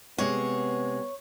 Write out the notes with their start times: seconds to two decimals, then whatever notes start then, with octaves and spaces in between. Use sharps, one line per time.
0.18 C3 G#3 B3 C#5